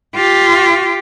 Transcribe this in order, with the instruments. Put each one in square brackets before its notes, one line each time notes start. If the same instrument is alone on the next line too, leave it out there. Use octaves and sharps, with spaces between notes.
[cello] F4 G4